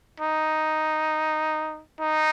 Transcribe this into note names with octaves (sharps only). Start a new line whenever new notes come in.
D#4
D#4